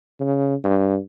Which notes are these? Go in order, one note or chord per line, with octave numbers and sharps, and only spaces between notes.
C#3
G2